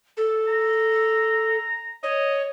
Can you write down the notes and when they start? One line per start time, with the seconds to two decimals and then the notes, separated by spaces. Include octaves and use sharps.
0.17 A4
0.47 A#5
2.03 C#5 D#5